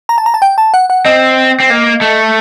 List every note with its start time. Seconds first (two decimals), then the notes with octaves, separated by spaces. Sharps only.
0.09 A#5
0.18 A5
0.26 A#5
0.34 A5
0.42 G5
0.58 A5
0.74 F#5
0.90 F#5
1.05 C4 D#5
1.60 C4
1.70 A#3
2.01 A3